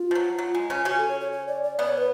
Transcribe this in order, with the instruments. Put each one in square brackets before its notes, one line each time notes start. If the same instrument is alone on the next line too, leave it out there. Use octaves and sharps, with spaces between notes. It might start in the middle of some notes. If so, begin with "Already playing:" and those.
Already playing: [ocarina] F4
[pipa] F3
F#3
F#3
G#3
C#3 C#4
[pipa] C#3 C#4 [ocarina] F#4
[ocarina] A4
C#5
C#5
C#5
D5
D5
[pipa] B2 B3 [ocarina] D5
[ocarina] C#5
B4